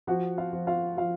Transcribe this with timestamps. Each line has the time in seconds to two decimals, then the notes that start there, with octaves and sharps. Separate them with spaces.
0.07 F3 F#4 F#5
0.38 F4 F5
0.53 F3
0.67 F4 F5
0.97 F3 F4 F5